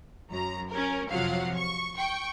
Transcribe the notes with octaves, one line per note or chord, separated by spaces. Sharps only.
F#2 A#5
C#4 A#4
F2 C3 F3 F#3 F5 F#5
C#6
G5 C#6